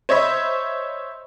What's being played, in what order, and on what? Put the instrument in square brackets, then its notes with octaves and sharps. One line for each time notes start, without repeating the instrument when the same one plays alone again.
[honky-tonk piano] C5 C#5 D#5 E5 B5